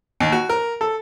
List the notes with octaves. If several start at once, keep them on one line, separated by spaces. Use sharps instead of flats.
D#2
F#4
A#4
A4